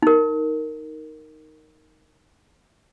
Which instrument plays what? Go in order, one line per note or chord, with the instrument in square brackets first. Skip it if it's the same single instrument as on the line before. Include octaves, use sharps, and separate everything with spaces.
[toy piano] D#4 A#4